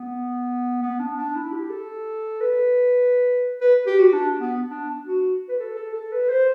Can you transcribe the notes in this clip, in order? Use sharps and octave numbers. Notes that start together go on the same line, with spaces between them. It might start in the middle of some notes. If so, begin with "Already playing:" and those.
Already playing: B3
B3
D4
D4
E4
G4
A4
B4
B4
G4
F#4
D4
B3
D4
F#4
B4
A4
A4
A4
B4
C5